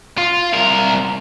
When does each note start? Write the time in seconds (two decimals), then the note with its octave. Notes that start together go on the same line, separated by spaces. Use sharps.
0.18 F4
0.54 C2 A#4